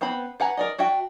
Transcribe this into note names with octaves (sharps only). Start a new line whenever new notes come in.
B3 C4 C5 B5
B4 F#5 G#5 A#5
A#4 D5 D#5
D4 F#4 E5 G5